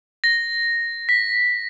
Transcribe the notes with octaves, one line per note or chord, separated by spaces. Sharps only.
A#6
B6